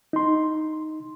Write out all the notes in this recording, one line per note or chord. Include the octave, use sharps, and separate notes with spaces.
D#4 C6